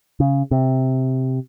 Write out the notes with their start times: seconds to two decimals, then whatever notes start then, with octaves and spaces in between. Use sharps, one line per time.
0.20 C#3
0.51 C3